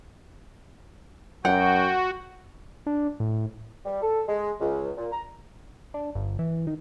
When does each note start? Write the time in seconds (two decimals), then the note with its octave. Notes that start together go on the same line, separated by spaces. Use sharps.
1.45 F#2 F#4 F#5 G5
2.86 D4
3.20 A2
3.85 G3
4.02 A4
4.28 G#3
4.60 C#2
4.97 A#2
5.12 A#5
5.94 D4
6.15 G1
6.39 E3
6.67 D#3